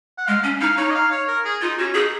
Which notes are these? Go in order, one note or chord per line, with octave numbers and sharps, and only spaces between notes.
F#5
G#3 F5
C#4
D#4 F5
D#4 C#5
D#5
F5
C#5
A#4
G#4
D#4 F4
C#4 F#4
D#4 G#4